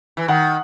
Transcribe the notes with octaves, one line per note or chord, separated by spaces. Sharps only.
E3
D#3 F#5